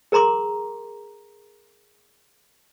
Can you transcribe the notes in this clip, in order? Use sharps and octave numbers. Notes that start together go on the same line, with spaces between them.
G#4 A#4 A#5 C6 D6